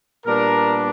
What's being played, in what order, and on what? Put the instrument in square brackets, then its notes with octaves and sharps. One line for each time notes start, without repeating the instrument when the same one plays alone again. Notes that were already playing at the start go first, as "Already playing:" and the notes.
[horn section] A#2 G3 B3 D4 A#4